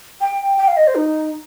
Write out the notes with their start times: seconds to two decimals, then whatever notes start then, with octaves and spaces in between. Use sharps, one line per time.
0.21 G5
0.58 G5
0.68 F5
0.77 D#5
0.87 C5
0.96 D#4